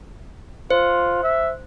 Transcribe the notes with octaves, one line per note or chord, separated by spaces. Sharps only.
F4 C5
E5